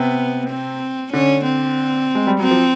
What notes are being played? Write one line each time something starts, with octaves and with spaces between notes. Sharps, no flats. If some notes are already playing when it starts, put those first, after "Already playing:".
Already playing: C3 B3
C4
D3 C#4
C4
G#3
G3
F#3 C4
F3